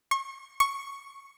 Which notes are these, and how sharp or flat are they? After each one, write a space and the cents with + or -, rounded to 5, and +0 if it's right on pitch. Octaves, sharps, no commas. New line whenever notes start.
C#6 -35
C#6 -5